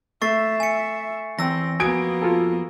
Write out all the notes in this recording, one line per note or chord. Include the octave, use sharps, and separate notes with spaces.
A3 E5 C#6 A6 C7
G#5 C#7
E2 C4 E6 A#6
F2 A#3 B3 F#4 G#5 D#6 G#6 D7
F4 A4